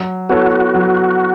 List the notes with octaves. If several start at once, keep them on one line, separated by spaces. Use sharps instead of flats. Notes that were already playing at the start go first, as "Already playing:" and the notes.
Already playing: F#3
B3 E4 F#4 A4 C#5
F#3